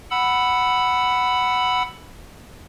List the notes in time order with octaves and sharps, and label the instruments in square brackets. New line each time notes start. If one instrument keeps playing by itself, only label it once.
[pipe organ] F#5 B5 E6